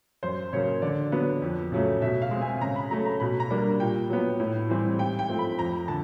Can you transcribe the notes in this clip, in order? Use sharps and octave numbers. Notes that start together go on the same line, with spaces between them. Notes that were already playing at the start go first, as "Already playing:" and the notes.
F#2 C5
C#3 F#3 A#3 C#5
D3 D5
F#3 B3 D4
F2
C#3 F#3 A3
B2 E5
F5
G#3 C4
G#5
C#3 A#5
B5
F#3 A3 C#4 A#5
A#5
B2 B5
A#5
G3 A#3 D4
A#2 G5
F#3 B3
A2
E3 G3 C4
G#2 G5
G5
F3 A3 C4
B5
F2 A#5
D3 A5